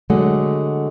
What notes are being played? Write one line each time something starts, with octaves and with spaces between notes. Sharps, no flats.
D3 F#3 G#3 A3 F#4 F#5